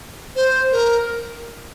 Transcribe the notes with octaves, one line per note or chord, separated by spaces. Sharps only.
C5
A#4